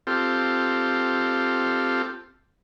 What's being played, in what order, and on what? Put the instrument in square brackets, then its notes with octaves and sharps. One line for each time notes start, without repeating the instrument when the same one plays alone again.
[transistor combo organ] C4 F4 G4 A4